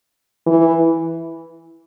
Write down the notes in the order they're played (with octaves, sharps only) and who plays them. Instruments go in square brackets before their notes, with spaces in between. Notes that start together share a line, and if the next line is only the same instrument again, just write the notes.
[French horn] E3